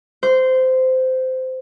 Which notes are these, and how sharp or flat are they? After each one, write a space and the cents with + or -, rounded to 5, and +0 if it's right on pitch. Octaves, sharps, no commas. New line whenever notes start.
C5 -15